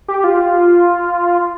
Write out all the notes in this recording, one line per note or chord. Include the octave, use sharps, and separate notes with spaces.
G4
F4